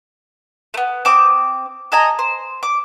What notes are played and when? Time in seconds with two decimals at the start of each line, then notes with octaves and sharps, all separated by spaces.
0.74 A3 B3
1.05 C4 D6 D#6
1.92 A4 D#5 G#5 A#5
2.19 C5
2.63 D6